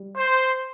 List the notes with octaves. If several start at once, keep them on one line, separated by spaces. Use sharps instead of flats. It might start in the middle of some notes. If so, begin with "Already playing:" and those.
Already playing: G3
C5